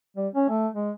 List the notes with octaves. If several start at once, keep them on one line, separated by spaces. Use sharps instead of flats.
G3
C#4
A3
G#3